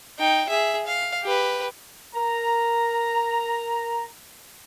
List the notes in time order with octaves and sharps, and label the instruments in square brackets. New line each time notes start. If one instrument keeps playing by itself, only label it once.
[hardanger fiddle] D#4 G5
G#4 E5
F5
G4 B4
[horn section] A#4 A#5